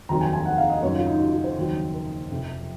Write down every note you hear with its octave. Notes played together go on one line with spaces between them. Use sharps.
F1 D#2 D#3 F#3 A#5
G#5
G#5
F#5
F5
D#5
F#1 F#2 D#3 F#3 C#5
F4
D#4
F#4
F4
C5
F1 D#2 C#3 F#3
A#4
F1 F2 C3 F3